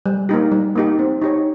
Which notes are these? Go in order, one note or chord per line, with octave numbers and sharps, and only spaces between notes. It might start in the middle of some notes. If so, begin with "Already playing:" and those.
G3
A#3 D#4 G4
G3
A#3 D#4 G4
C4
D#4 G4 C#5